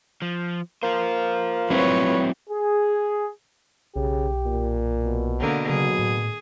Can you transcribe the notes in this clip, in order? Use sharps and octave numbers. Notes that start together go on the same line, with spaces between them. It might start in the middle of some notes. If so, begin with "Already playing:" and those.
F3
A#3 F4 C5
F#3 C4 E4 B4 C#5
G#4
B1 C#3 G4
A#2
B2
D3 A#3 B3
C#3 F#3 G#4
A2